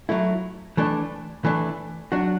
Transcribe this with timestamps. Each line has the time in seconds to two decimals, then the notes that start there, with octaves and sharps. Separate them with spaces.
0.09 F#3 A3 E4
0.77 E3 A3 D4
1.45 E3 A3 D4
2.12 F#3 D4 F#4